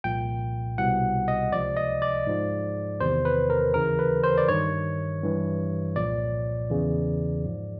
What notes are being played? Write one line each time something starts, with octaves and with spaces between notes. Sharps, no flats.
C2 A#2 F3 G5
C2 B2 F#5
D#5
C#2 C3 F3 D5
D#5
D5
G#2 F3
E2 C3 D#3 C5
B4
A#4
D#2 C#3 E3 A#4
B4
C5
D5
G2 D#3 C#5
G2 E3
C2 A#2 F3 D5
E2 C#3 E3
G#2 F3